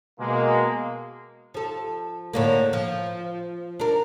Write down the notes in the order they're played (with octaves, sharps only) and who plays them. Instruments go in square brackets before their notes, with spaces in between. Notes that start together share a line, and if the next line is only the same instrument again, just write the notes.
[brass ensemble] B2 G#3 A#3
[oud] F3 A4
A2 D3 A#3
F3
D4 A#4